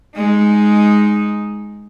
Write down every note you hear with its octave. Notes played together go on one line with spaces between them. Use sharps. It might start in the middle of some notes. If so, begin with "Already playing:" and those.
G#3 D#4